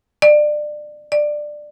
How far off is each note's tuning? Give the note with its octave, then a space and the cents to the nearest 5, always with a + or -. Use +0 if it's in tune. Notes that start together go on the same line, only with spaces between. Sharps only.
D5 +25
D5 +15